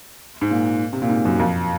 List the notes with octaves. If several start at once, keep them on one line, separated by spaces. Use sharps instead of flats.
G#2
A#2
C3
A#2
G#2
F#2
F2